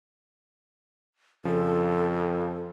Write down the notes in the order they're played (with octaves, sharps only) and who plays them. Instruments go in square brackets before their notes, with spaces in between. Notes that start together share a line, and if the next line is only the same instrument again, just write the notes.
[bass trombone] F2 [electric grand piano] C#3 F3 [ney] A4